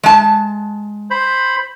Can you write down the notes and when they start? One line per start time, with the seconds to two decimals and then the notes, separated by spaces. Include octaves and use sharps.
0.03 G#3 A5
1.11 C5 B5